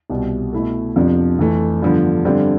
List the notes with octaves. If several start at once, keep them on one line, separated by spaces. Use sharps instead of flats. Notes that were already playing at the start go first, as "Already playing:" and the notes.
C2 B2 G3
B2 A3 E4 A4
F2 C3 F3 B3 D4
F2 E3 A3
G2 D3 F3 B3
G2 D3 G3 C4